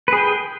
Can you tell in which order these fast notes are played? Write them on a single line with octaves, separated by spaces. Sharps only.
B4 G#4 G5